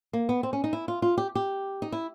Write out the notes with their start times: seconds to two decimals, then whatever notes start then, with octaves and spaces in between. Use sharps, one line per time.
0.13 A#3
0.29 B3
0.43 C4
0.53 C#4
0.64 D#4
0.73 E4
0.88 F4
1.02 F4
1.18 G4
1.35 G4
1.82 D#4
1.92 E4